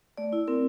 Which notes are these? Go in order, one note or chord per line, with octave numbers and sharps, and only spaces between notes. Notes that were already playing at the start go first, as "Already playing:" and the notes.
A3 D5
E4
C4 A#4